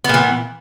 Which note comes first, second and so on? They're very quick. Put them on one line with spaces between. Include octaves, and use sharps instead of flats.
B3 A#2 E3